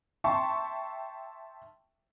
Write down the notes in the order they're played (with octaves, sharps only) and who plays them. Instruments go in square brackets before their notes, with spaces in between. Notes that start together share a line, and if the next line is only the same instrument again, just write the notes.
[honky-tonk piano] E5 G5 A5 C6 C#6